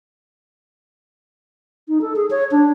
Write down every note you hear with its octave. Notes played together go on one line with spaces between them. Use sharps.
D#4
A4
G#4
C#5
D4